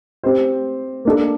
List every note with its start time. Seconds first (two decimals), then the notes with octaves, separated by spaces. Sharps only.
0.23 C4 G4 C5
1.05 A#3 D4 A4